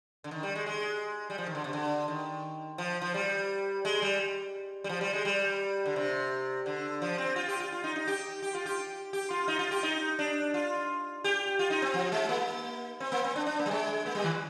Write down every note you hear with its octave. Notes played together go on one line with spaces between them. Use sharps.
D3
D#3
G3
G#3
G#3
G3
F3
D#3
D3
C3
D3
D#3
F3
F3
G3
G#3
G3
G3
F3
G3
G#3
G3
D3
C3
D3
F3
C4
F4
G4
F4
F4
D#4
D#4
G4
G4
F4
G4
G4
F4
D#4
F4
G4
D#4
D4
F4
G4
F4
D#4
C4
F3
G#3
A#3
C4
A#3
C4
D4
D4
A#3
G3
G#3
A#3
G3
D#3